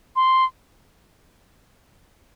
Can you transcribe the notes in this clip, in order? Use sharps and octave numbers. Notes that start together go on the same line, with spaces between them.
C6